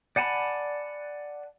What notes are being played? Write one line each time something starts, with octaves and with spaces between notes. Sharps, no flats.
D5 F#5 G#5 A5 B5